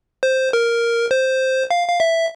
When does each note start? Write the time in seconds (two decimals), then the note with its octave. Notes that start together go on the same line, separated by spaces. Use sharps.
0.23 C5
0.53 A#4
1.11 C5
1.71 F5
1.88 F5
2.00 E5